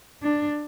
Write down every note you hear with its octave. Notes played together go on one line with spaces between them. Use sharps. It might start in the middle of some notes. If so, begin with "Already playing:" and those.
D4